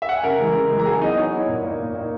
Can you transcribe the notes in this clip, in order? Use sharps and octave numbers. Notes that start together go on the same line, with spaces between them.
E5
F#5
G#5
C#3 A#4 A#5
E3 G#3
C#3
E3 G#3
A#5
F#3 G#4 G#5
B3 D#4 E4 D#5
F#3 C#5
B3 E4
A#2
A#3 D#4
A#2
A#3 D#4